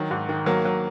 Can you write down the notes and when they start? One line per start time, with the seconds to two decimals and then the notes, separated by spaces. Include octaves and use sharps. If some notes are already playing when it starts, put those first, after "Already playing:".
Already playing: D#3 F#3
0.11 G#2
0.29 D#3
0.46 F#3 A#3
0.65 F#3